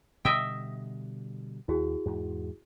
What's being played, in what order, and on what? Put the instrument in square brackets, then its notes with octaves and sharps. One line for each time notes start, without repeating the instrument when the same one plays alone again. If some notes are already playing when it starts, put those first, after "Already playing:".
[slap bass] B2 D3 G3 [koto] D#5 E5 G5
[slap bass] D#2 [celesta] E4 F#4 G#4
[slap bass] E2 G#2